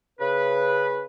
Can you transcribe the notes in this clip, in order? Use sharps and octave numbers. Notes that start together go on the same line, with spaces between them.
C#3 B4